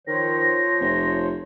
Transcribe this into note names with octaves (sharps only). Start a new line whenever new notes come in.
D#3 F3 C5 C#5 A#6
F1